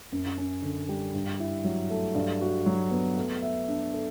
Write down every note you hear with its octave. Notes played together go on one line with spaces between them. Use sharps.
F#2
C#4
D3
G3
G2
E4
F#3
A3
G2
F#4
F#3
B3
A3
E5
D4
A4